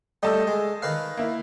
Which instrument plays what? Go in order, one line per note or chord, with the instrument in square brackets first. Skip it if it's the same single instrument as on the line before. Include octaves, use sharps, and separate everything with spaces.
[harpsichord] G3 A3 [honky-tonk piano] D#5 A5 E6
[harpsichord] G#3
D#3 B4 F5
[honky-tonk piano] A#3 E4